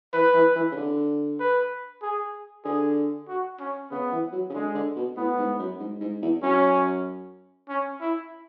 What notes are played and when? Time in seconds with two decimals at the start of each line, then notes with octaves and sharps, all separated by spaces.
0.13 E3 B4
0.34 E3
0.56 E3
0.71 C#3
0.76 D3
1.40 B4
2.02 G#4
2.64 D3 G#4
3.29 F#4
3.60 C#4
3.91 C#3 B3
4.12 E3
4.32 F#3
4.50 C#3
4.54 D3 G#3
4.75 D3
4.96 B2
5.17 A2 B3
5.38 G#2
5.59 F#2
5.80 G#2
6.00 G#2
6.22 E2
6.43 F#2 C#4
7.68 C#4
8.01 E4